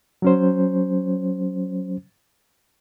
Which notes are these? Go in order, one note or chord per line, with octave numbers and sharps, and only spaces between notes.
F#3 C#4 C5